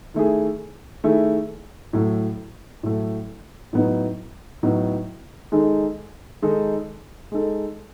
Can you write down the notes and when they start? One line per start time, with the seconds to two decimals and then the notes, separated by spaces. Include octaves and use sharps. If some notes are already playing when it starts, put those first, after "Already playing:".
0.14 D#3 A3 E4 G#4
1.04 D#3 A3 E4 G#4
1.93 A2 F#3 A3
2.83 A2 F#3 A3
3.73 A2 F#3 B3 D#4
4.63 A2 F#3 B3 D#4
5.52 D#3 G#3 D#4 A4
6.42 D#3 G#3 D#4 A4
7.32 G#3 D#4 A4